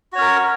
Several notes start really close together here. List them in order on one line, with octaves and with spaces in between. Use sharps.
F#4 C#5 C#4 A#4